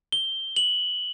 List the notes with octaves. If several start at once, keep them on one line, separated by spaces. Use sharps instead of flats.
G7
F#7